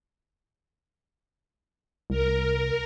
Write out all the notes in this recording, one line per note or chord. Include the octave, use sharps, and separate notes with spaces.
C2 A#4